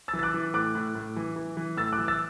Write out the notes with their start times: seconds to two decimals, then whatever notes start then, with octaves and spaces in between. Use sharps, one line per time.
0.08 E6 A6
0.13 E3
0.19 A6
0.23 D6 F#6
0.34 E3
0.54 A2 D6 F#6
0.75 A2
0.95 A2
1.16 E3
1.36 E3
1.57 E3
1.77 A2 E6 A6
1.93 D6 F#6
1.99 E3
2.08 E6 A6